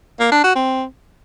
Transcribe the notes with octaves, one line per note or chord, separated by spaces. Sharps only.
A#3
D4
F#4
C4